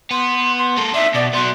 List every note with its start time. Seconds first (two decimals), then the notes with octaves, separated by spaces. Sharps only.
0.11 B3 C6
0.57 C6
0.77 A#3 A4
0.94 D4 D#4 E5
1.14 B2 D5
1.33 F#3 B3 C6